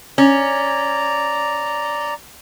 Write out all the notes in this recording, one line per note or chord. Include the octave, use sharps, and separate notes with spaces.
C#4 D5 A#5